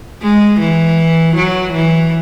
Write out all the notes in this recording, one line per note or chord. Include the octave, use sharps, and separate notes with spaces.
G#3
E3
F#3
E3